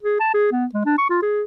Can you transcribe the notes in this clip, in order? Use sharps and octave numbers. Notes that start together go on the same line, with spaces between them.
G#4
A5
G#4
B3
G#3
D4
C#6
F4
G#4